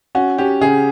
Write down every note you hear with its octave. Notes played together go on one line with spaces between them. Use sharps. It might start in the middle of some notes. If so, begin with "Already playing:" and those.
C#4 F#4
C#4 G4
C#3 G#4